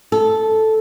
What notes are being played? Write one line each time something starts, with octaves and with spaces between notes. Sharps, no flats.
A4